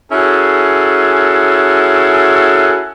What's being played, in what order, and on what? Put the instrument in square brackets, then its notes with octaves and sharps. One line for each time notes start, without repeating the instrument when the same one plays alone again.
[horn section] C#4 E4 F#4 G#4 A4